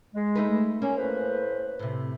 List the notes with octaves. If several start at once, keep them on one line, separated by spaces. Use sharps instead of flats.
G#3
A3 D#4 B4
A#3 C#4
A2 B4 C5
A2 C3